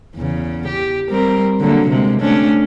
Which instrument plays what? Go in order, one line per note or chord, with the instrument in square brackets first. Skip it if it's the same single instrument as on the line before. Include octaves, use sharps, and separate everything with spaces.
[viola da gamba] E2 C#3
G4
G3 C4 A#4
D3 F#3 A#3
C3 G#3
A3 C#4 D4